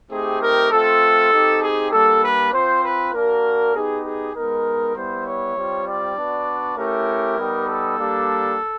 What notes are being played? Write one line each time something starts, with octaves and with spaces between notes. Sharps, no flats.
A3 C4 D#4 G4 G#4
A#4
A3 C4 F4 A4
C4 D#4 G4
G#4
G3 A#3 D4 A4
B4
C4 F4 C5
B4
A#3 D4 F#4 A#4
B3 D#4 G4 G#4
G#4
G#3 B3 D#4 A#4
G3 B3 E4 C5
C#5
G3 C4 F4
D5
B3 D4 F#4
A3 C#4 E4 G4 A#4
G3 B3 D#4 G4
A4
G3 A#3 D4 G4